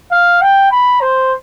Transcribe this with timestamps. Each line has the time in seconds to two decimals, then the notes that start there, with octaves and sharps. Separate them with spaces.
0.12 F5
0.41 G5
0.71 B5
1.01 C5